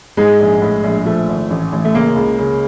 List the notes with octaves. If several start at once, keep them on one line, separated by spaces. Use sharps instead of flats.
G#2 G#3
A#1
A2
A#1
F3 A3
G#1
A1
A1
A3
C#3 A#3
C#2
C#3